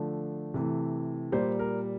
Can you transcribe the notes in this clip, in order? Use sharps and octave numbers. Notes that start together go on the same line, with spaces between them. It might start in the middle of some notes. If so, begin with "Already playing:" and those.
Already playing: D3 F3 A3
C3 E3 A3
A#2 G3 A#3 C5
A#4